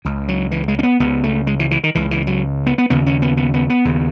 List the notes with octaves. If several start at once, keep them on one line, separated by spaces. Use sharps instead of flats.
C#2 C#3
F#3
E3
G#3
C#4
B3
C#2 C#3 B3
A3
G#3
E3
E3
D#3
C#2 C#3 E3
E3
F#3
B3
B3
D#2 C#3 B3
C#4
B3
B3
B3
B3
D#2 C#3